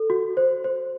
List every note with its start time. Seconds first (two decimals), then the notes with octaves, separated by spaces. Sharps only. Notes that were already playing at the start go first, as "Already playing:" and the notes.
Already playing: A4
0.10 F#4
0.37 C5
0.64 C5